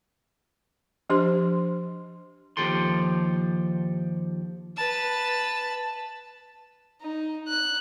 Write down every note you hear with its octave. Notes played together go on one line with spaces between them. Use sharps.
F3 D4 G4 C5 C6
D#2 F3 G4 A4 C6
B4 A5
D#4
F#6